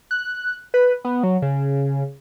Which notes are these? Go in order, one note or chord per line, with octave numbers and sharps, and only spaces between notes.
F#6
B4
B3
F#3
C#3